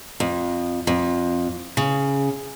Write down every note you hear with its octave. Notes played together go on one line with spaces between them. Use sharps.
F2
F2
C#3